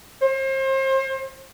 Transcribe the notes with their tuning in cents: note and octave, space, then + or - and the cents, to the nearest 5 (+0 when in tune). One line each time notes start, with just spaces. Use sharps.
C5 +35